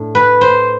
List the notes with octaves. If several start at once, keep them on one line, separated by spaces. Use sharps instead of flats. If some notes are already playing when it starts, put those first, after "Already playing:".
Already playing: A2 D4
B4
C5